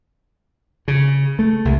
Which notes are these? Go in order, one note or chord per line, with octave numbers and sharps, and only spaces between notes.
C#3
A3
C2